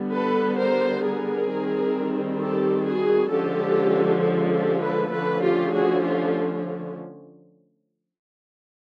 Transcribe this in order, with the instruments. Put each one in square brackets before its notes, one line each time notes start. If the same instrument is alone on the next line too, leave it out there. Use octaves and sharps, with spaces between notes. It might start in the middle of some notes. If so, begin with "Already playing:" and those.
Already playing: [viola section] D3 G3 B3
A4 B4
A#4 C5
G#4 A#4
D#3 G3 C4
G4 A4
F#4 G#4
D3 F3 G#3 C#4 G4 A4
G4 A4
G4 A4
A4 B4
D3 F3 A3 C#4 A4 B4
F4 G4
F#4 G#4
F4 G4